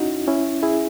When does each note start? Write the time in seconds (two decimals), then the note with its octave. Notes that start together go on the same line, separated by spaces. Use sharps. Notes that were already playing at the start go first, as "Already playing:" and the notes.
Already playing: C#4 D#4 E4 F#4
0.27 C#4 E4
0.63 E4 G#4